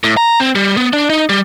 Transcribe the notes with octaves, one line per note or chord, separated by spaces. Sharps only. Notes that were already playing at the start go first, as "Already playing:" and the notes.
A2
A#5
C4
G3
B3
D4
D#4
G3